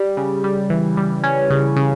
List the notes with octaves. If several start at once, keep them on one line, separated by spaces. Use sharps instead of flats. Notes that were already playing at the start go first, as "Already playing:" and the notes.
Already playing: G3
C#3
G3
E3
G3
C#4
C#3
C#3